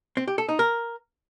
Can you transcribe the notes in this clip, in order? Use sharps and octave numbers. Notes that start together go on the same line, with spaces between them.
C4
G4
A4
D#4
A#4